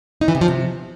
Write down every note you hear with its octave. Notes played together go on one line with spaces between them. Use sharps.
D#4
E3
C3
F3
C3